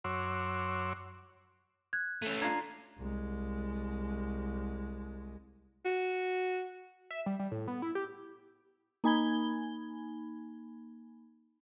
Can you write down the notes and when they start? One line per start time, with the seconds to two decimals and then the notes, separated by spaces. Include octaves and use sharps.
0.04 F#2 F#4 C#5 C6 D6 E6
1.93 F#6 G#6
2.22 A3 C#4 D#7
2.42 D4 F4 A#5 G#6 C7
2.98 C2 G#3
5.85 F#4
7.10 E5
7.26 G3
7.39 G3
7.51 A2
7.68 B3
7.82 E4
7.95 G4
9.04 A#3 D#4 G#5 B5 G#6 G7